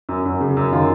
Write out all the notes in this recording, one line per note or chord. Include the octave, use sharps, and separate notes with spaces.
F#2
F#2
C#3
F#2
D#3 F4